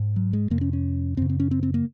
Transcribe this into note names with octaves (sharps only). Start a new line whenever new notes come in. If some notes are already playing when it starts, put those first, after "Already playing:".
Already playing: G#2
F#3
G#3
F2 C3 A#3
C#4
C#4
F#2 C#3 C4
C4
C#4
C4
C4
A#3